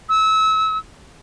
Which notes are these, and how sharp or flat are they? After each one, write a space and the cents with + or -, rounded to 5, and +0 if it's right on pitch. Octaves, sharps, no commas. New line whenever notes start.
E6 -30